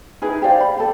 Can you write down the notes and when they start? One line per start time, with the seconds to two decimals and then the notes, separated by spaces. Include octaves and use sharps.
0.22 D#4 E4 G#4 B4
0.42 G4 C5 D5 F5
0.61 B5
0.77 G4 A4